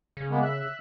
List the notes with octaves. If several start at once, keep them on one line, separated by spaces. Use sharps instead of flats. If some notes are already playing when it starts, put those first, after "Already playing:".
C#3
G#3 A#3 B3
E5 F#6